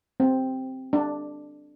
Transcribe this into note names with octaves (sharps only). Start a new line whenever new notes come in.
C4
D4